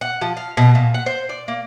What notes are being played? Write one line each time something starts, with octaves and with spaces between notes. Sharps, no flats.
F#5
F3
F5
B2
A#2
F#5
C5
D5
A#3